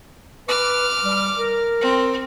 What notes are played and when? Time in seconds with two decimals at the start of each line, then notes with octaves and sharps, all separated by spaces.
0.48 B4 D6 F6
1.04 G3
1.37 A#4
1.81 C4